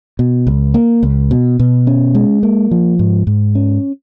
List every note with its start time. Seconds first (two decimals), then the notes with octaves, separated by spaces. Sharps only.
0.19 B2
0.47 C#2
0.74 A#3
1.03 C#2
1.31 B2
1.59 B2
1.87 C#4
2.15 G#3
2.43 A#3
2.71 F3
2.99 G#2
3.27 G#2
3.55 C#4